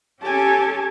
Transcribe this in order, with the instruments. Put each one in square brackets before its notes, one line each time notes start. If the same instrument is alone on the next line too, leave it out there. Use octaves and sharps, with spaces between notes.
[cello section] C#4 G4 A4 [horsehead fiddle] G#5 A5